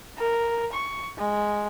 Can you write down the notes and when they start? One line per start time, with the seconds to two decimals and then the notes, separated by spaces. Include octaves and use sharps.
0.18 A#4
0.73 C#6
1.19 G#3